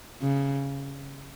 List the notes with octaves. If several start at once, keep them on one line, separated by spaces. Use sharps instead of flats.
C#3